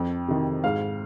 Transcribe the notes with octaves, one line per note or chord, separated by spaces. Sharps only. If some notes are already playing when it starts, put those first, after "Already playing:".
Already playing: F2 G5
C3 D#3
G#2 F5